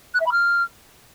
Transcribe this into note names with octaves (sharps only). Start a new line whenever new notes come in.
F#6
E5
B5
F6